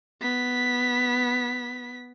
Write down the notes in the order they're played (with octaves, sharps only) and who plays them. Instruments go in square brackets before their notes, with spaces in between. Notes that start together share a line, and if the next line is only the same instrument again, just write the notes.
[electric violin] B3 B6